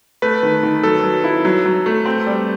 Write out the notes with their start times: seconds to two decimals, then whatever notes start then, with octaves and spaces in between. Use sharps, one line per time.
0.22 A3 B4
0.43 D#3
0.63 D#3
0.83 F#3 A4
1.03 F#3
1.24 E4
1.45 F#3
1.66 F#3
1.86 A3
2.06 C4
2.26 G3